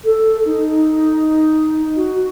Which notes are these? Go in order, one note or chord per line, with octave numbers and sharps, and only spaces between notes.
A4
D#4
F#4